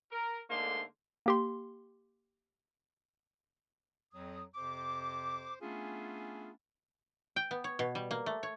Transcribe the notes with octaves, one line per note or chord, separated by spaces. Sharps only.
A#4
G#2 D3 A3 A#3 D4 C6
A#3 G4 C6
F2 F#3 D#6
F2 C3 C5 D6
A3 B3 C#4 D4 F4 G#4
G5
B3
C#5
B2
G3
A#3
A3
C#5